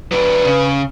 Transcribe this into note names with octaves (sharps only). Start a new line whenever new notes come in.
F#3 D4 B4
C#3